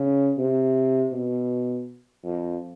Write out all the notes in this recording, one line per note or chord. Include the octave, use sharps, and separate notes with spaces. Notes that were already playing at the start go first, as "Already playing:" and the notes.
Already playing: C#3
C3
B2
F2